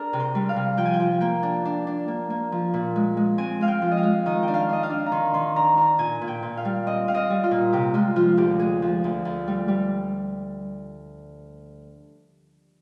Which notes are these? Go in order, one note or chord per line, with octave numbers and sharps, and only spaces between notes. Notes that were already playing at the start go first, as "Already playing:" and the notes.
Already playing: D4 G#4 A#4
C3
C5
G3
F5
C3
F3 G5
G#5
G5
F3
A#3 G5
D4
D4
D4
A#3
A#3
F3
A#2
G#3
G#3
C4 G#5
G#3 F5
G5
F3
D#5
F5
G#3
D#3 D#5
G5
D4
F5
D4 D#5
F5
D4
A#5
D#3 C6
D#3 C6
D4 A#5
D4 A#5
A#2 G#5
A#2
G5
A#2
F5
G3
C4 D#5
C4 F5
D#5
G3
F4
A#2
C3 G4
G#3 F4
F3 F4
D2 G4
G#3 G#4
F3
D2
D2
G3
G3